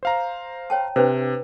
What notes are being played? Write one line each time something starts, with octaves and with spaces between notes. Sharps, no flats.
C5 F5 A#5
C#5 G5 A5
C3 D4 B4 C5